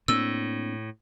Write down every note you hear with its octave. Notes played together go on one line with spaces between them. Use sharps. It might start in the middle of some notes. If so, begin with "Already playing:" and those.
A2 A#3 C4 D4 E6